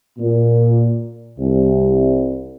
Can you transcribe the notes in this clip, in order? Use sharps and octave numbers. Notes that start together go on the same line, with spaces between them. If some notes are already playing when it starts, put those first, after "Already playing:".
A#2
C2